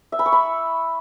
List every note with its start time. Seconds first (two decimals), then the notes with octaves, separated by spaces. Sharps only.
0.12 E5
0.19 B5
0.26 C#6
0.32 B5